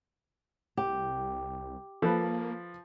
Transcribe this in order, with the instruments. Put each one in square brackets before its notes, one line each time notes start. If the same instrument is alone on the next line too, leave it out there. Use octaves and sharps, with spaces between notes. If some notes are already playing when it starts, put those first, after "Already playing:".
[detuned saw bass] C2 [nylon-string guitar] G4
[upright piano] F3 [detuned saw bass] A#3 [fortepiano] A4 B4